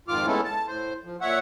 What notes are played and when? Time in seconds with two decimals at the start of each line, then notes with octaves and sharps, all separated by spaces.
0.08 F2 G#2 D#3 F4 D6 F6
0.27 G#3 A3 B3 C#4 E4 A4
0.44 A5
0.67 A2 C5
1.04 F3
1.21 A#2 C#5 E5 F#5